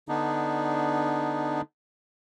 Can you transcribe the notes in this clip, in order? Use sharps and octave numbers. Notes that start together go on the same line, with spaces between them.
D3 B3 D4 D#4